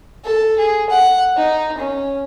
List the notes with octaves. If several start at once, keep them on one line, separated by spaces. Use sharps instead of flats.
A4
G#4
F#5
D#4
C#4